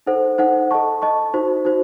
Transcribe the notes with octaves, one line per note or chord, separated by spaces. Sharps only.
D#4 A4 C5 F#5
D#4 A4 C5 F#5
A4 D#5 A5 C#6
A4 D#5 A5 C#6
D#4 F#4 C5
D#4 F#4 C5